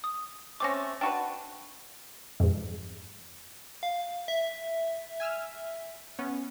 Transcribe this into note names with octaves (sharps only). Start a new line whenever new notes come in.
D#6
A3 C4 C#4 D6 A#6
D4 F#4 B4 G5 A5
F2 G#2
F5
E5
G#5 E6 F6
B3 C#4